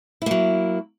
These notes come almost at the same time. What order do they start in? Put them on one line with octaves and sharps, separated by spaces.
E4 A#3 F#3